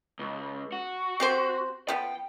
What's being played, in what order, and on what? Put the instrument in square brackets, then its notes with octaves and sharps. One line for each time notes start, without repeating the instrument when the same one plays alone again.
[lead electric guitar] C#2
F#4
[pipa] C4 G4 C5
[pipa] F3 B3 [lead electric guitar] G5